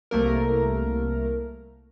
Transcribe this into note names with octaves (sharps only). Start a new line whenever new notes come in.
C2 A3 A#3 A#4